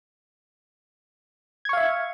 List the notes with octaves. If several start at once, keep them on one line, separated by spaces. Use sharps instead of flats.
E5 F5 C#6 G#6